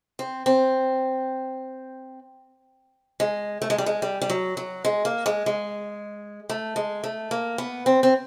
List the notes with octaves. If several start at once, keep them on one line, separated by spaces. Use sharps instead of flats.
C4
C4
G#3
A3
G#3
G3
G#3
G3
G3
F#3
F#3
G#3
A#3
G#3
G#3
A3
G#3
A3
A#3
B3
C4
C4